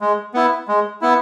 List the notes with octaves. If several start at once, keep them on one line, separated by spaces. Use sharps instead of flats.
G#3
B3 E4
G#3
B3 E4